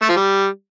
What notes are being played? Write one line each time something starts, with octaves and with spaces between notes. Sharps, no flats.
A3
F3
G3